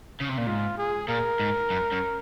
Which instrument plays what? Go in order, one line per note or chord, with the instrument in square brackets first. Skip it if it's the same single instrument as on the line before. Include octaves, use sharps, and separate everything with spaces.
[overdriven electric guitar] C#3
C3
A#2
[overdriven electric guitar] G#2 [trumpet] F4
[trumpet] G#4
[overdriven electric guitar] A#2 [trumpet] A#4
[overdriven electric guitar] G#2
F#2
F#2